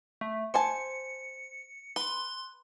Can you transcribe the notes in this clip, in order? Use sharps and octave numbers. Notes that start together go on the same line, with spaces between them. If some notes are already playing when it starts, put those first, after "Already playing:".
A3
C5 G#5 A5 C#7
B4 C6